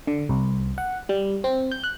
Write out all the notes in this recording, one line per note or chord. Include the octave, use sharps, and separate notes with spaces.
D3
C2
F#5
G3
C4
G6
F#6